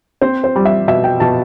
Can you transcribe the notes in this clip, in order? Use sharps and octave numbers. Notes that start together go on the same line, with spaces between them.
C4 C5
C5
G3
E5
B2 E5
G5
B2 A5